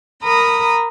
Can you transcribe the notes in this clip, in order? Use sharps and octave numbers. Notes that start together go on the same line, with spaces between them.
A#4 A#5 B5 D#6